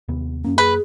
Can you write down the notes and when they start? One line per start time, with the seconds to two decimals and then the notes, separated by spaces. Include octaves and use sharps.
0.08 D#2 C3 B3
0.44 F#2 A#3 C#4
0.58 G#4 B4